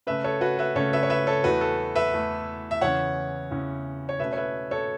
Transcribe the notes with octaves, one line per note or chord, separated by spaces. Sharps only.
C#3 A3 C#4 B4 E5
A4 C#5
F#4 B4
B4 E5
C#3 A3 C#4 A4 C#5
B4 E5
C#5
B4 E5
A4 C#5
E2 E3 A3 F#4 B4
A4
B4 E5
E2 E3 A3
E5
E2 C#3 E3 C#4 C#5 F#5
E2 C#3 E3 C#4
C#5
B2 A3 C#4 B4 E5
C#5
B4 E5
A4 C#5